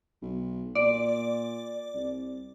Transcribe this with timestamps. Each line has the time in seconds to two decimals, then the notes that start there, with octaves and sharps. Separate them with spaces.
0.22 B1
0.75 A#2 D5
1.95 C2